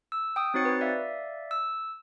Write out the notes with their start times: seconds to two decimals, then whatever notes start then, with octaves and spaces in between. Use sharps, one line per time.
0.12 E6
0.36 G5 D#6
0.54 C4 D#4 F#4 C#5 A6 C#7
0.65 B4
0.81 D5 E5 F5
1.51 E6